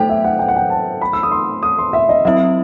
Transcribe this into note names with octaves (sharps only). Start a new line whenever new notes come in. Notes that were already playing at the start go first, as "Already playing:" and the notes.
Already playing: F#3 A3 D#4 A4 C5 G5
E5
F#5
G5
F#5
G5
A5
B5
E6
D#6
C6
D#6
C6
E5
D#5
F#3 C4 E4 E5